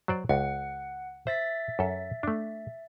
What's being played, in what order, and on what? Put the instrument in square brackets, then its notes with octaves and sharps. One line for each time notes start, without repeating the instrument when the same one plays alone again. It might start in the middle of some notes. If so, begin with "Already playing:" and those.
[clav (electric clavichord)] F#3 C5 D5
[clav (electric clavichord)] C#2 [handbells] F#5
[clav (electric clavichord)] C5 [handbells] E5 A6 B6
[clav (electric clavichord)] F#2 A4
A3 D4